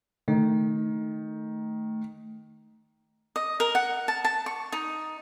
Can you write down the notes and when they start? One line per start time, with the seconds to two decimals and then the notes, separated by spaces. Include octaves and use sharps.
0.28 D#3 A3
3.36 D#5
3.60 A#4
3.75 F#5
4.08 A5
4.24 A5
4.46 C#6
4.72 D#4